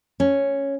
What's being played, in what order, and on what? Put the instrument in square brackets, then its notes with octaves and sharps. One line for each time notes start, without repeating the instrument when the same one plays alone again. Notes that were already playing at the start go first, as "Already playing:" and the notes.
[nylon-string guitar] C#4